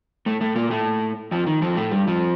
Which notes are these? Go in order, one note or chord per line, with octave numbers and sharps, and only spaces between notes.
A2 A3
A2 A3
A#2 A#3
A2 A3
F2 F3
D#3
F2 F3
A2 A3
G2 G3
F2 F3